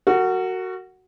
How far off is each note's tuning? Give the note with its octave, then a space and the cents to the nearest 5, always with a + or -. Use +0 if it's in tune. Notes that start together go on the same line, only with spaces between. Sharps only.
F#4 +5 A#4 -35